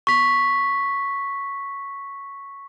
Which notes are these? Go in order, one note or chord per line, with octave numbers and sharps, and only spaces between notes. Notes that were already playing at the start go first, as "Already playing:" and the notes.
C#6 B6